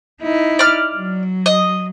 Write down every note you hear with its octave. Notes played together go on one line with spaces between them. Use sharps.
D#4 E4
D5 F6
F#3
D#5